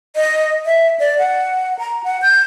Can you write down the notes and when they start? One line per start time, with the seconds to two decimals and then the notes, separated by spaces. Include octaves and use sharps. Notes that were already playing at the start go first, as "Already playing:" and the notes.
0.16 D#5
0.66 E5
0.99 D5
1.18 F#5
1.79 A#5
2.04 F#5
2.22 G6